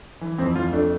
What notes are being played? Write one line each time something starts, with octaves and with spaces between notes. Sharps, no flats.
E3
F2 C4
F2 F4
A3 D4